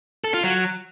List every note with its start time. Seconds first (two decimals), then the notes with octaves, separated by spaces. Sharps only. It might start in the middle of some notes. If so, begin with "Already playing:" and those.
0.24 A4
0.34 F4
0.44 F#3